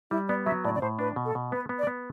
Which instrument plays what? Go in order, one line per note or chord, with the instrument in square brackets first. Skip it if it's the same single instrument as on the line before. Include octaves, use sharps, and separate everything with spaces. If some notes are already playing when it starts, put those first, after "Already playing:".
[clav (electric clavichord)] G3 [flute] E4
[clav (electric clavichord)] B3 [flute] D5
[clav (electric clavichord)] F#3 [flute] E5
[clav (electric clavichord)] A2 [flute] D5
[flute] D5
[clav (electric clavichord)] A2 [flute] C5
[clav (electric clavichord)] D4 [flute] B4
[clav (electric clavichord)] B2
[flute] A4
[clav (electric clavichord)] B2
[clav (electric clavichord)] B3 [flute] B4
[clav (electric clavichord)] B3
[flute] D5
[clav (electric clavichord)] B3